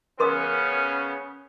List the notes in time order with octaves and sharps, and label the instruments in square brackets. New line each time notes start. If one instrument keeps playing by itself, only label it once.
[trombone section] C#3 B3 C#4 [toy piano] A#4 C6 D#6